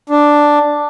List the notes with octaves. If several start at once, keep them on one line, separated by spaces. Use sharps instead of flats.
D4